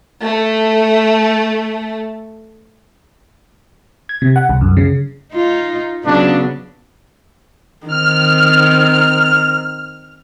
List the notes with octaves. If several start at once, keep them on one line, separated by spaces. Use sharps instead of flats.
A3 A4
G#6
C3
F#5
C2
F#2
C#3
D#4 F4
C#3 F#3 B3 D4
D#3 C4 F6